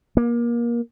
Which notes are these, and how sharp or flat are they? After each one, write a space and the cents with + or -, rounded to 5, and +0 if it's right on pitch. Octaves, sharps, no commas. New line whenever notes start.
A#3 +25